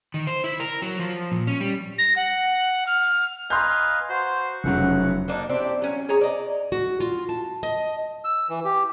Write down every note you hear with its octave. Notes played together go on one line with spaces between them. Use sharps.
D#3
C5
E4
A#4
F#3
F3
A#2
C#4
G3
A#6
F#5
F6
B4 D#5 F5 G#5 A#5 C6 G6
F#4 C5
F1 C#3 F#3 F#5
A#3 D4 D#4
C4 D4 E4 G4
F#3 C#4
G#4 C#5 A#5
D5 D#5
F#4
F4
A5
D#5
E6
E3
G4